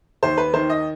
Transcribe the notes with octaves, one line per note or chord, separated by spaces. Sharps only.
D#2 C5
B4
D#3 C5
D#5